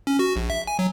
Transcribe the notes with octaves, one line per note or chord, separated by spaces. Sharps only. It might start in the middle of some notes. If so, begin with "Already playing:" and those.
C#4
F#4
A#1
E5
G#5
F#3